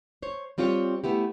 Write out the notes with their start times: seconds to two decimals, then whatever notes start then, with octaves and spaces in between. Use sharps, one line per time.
0.22 C5 C#5
0.58 G3 C4 F4 G4 C#5
1.04 A3 B3 E4 G4